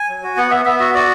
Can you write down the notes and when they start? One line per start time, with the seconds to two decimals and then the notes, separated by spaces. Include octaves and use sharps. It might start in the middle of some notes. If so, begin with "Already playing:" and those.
Already playing: G#5
0.09 F#3
0.23 F#4
0.37 B3 F#5
0.51 B3 E5
0.65 B3 E5
0.80 F#4 E5
0.95 F#4 D5